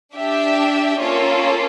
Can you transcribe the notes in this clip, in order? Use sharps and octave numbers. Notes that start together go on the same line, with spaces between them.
D4 G4 E5
A#3 C#4 F4 A4 C#5